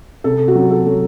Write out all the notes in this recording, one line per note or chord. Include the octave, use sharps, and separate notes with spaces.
C3 A4
F#4
F#3
A4
F#3